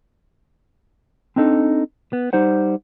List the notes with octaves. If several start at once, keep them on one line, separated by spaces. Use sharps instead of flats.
C4 D4 D#4 A4
B3
G3 D#4 C5 F#5